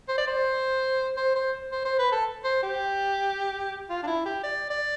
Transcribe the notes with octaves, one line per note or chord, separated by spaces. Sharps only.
C5
D5
C5
C5
C5
C5
C5
B4
A4
C5
G4
F4
D4
E4
G4
D5
D5